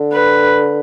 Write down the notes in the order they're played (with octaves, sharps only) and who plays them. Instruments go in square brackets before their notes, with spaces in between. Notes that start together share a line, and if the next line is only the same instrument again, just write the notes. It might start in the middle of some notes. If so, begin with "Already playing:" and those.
Already playing: [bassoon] D3
[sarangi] B4